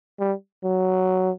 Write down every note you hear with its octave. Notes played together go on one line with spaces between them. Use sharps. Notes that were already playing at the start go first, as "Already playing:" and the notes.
G3
F#3